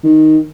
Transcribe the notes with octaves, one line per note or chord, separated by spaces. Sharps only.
D#3